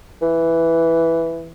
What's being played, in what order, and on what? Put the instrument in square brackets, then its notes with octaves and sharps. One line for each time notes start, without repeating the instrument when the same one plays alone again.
[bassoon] E3